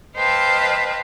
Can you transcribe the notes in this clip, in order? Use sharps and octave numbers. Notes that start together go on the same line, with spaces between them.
B4 C5 D#5 F5 G5 A5